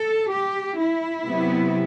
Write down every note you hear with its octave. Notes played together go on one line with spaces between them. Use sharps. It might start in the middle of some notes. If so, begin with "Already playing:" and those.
Already playing: A4
G4
E4
C3 F#3 B3